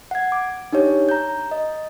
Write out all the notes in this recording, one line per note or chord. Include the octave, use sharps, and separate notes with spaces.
F#5 G#6
D6
D4 D#4 G4 C#5
A#5 G6
D#5